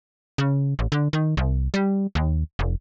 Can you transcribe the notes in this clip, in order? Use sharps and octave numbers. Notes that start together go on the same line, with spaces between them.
C#3
A1
D3
D#3
C2
G3
D#2
F1